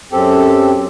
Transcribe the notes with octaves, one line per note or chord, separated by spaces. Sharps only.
F#2 C4 G4 A4